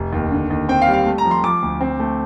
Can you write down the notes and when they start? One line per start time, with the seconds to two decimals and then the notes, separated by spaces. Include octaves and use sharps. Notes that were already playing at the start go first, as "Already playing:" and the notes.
Already playing: F1
0.12 D#2
0.31 D3
0.50 D#2
0.69 C4 G5
0.82 F5
0.88 G3
0.93 F5
1.06 A3
1.18 A#5
1.25 F3
1.31 C6
1.44 F3 D6
1.62 D2
1.81 C4
2.00 A3